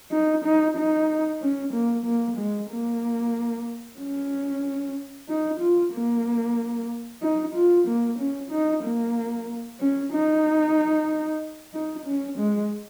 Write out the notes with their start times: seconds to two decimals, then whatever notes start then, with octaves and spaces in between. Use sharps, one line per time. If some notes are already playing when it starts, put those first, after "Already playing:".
0.12 D#4
0.45 D#4
0.77 D#4
1.42 C#4
1.73 A#3
2.06 A#3
2.38 G#3
2.70 A#3
4.00 C#4
5.29 D#4
5.61 F4
5.94 A#3
7.22 D#4
7.55 F4
7.87 A#3
8.19 C#4
8.51 D#4
8.84 A#3
9.80 C#4
10.13 D#4
11.74 D#4
12.06 C#4
12.39 G#3